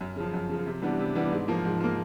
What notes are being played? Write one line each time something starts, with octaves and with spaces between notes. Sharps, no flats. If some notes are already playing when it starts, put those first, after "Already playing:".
F#2
C#3 F3
F#2
C#3 F3
C3
E3 G3 B3 D4
C3
E3 G3 B3 D4
G#2
F3 A#3
G#2
F3 A#3